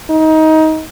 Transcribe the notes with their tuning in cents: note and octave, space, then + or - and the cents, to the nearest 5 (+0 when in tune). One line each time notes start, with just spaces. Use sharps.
D#4 +20